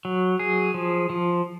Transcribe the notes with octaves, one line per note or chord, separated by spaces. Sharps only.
F#3
G#4
F3
F3